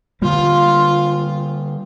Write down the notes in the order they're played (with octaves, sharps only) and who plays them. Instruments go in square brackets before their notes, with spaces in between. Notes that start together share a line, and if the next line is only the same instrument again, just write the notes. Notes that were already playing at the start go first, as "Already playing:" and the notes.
[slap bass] D3 G3 A#3 [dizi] F4